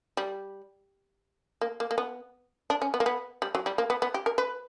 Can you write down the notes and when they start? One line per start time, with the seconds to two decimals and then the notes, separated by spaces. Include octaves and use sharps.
0.17 G3
1.61 A#3
1.80 A#3
1.91 A#3
1.98 B3
2.70 D4
2.82 C#4
2.94 B3
3.00 A#3
3.06 B3
3.42 G3
3.55 F#3
3.66 G3
3.78 A#3
3.90 B3
4.02 B3
4.14 G4
4.26 A#4
4.38 B4